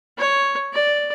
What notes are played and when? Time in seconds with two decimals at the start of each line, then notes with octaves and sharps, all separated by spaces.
0.17 C#5
0.73 D5